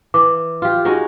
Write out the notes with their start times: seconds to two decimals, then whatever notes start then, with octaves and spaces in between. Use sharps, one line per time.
0.14 E3 D6
0.62 F4 G4
0.85 G#3 D#4 F#4